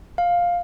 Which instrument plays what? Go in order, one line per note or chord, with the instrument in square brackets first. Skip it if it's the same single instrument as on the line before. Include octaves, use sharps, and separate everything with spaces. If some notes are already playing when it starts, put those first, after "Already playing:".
[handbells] F5